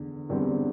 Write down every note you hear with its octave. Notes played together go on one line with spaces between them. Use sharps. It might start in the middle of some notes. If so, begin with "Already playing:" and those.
Already playing: E2 D3
E2 D3 G3 C4